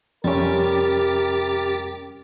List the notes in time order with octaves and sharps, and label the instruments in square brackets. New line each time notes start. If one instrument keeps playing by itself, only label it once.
[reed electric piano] F2 C#4 [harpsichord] C3 G3 [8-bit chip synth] G4 A6 [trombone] A#4